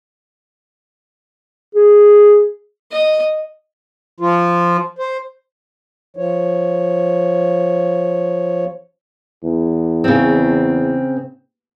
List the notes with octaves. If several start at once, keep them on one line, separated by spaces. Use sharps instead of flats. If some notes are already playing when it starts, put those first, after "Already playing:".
G#4
D#5
F3 F4
C5
F3 C#5
E2
C#3 C4